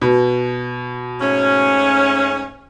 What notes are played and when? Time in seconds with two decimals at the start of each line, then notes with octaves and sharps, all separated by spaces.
0.02 B2
1.21 G#2 A3 C#4